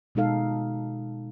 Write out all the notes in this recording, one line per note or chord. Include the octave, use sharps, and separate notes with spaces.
B2 G#3 D#4 A4 F5